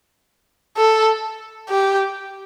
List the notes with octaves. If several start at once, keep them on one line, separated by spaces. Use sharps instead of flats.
A4
G4